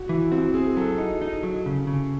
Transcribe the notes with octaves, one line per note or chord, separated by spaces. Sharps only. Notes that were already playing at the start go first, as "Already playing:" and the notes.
Already playing: F#4
E3 E4
C4 F#4
C4 G#4
G#4
F#3 A4
D#4
D#4
F#3
C#3
C#3